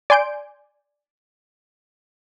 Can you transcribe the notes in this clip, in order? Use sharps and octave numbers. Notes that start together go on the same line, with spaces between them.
D5 G#5 C6 G6 D7